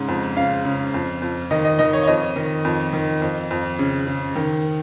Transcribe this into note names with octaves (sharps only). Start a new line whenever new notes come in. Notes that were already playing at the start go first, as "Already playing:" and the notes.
Already playing: G#2 C#3
F2
C#3 F5
C#3
F2
F2
D#3 D#5
D#5
D#3 D#5
C#5
C#5
F2 D#5
D#3
F2
D#3
F2
F2
C#3
C#3
D#3